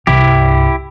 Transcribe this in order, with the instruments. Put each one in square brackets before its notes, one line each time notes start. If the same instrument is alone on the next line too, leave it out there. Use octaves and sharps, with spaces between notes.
[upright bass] C2 G2 [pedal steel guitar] E4 G4